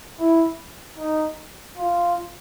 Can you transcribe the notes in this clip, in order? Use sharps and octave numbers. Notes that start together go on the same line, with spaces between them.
E4
D#4
F4